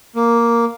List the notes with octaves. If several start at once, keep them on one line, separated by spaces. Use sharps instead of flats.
A#3